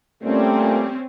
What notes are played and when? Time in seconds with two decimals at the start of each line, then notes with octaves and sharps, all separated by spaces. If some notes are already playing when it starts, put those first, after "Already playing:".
0.23 A#2 G3 A3 C4 C#4